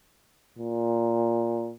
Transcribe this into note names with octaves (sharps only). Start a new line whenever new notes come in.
A#2